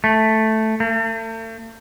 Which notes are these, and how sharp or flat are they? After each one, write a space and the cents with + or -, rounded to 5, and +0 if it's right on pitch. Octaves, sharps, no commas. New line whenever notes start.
A3 +0
A3 +40